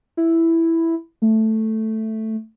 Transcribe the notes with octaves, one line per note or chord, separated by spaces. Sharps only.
E4
A3